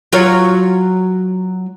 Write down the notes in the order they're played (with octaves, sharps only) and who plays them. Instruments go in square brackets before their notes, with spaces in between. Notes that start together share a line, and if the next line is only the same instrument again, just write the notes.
[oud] F#3 F4 C#5